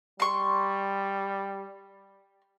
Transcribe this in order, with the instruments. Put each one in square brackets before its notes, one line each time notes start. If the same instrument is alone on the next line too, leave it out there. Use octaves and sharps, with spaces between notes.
[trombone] G3 [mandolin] C6 C#6